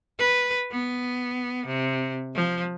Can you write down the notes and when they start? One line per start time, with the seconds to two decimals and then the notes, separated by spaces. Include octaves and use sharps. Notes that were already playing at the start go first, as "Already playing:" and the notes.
0.19 B4
0.72 B3
1.66 C3
2.35 F3